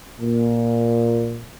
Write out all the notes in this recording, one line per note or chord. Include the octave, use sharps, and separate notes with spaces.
A#2